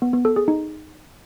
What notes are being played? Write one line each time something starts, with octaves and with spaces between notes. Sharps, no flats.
B3
B3
A4
G#4
D#4